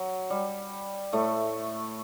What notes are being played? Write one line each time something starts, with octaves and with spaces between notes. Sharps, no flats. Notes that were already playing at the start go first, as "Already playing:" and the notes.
Already playing: F#3
G3
A2 A3